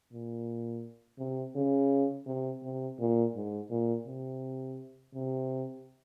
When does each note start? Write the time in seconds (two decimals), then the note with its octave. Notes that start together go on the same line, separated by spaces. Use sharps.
0.12 A#2
1.19 C3
1.55 C#3
2.26 C3
2.63 C3
2.99 A#2
3.35 G#2
3.70 A#2
4.06 C3
5.14 C3